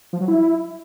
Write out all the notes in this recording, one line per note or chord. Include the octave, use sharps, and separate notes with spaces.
F3
F#3
E4